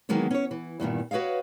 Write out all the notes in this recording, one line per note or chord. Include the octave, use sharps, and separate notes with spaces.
D#3 E3 F#3 G#3 A#3 B3
C#4 C#5
E3
E2 G2 A#2 D#3
F#4 B4 C#5 D#5 F5